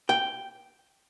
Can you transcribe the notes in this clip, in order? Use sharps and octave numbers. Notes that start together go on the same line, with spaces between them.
G5